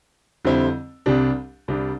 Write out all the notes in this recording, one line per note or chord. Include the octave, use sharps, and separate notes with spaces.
F2 D3 G3 C4 E4
C2 C3 G3 D4
C2 C3 G3 D4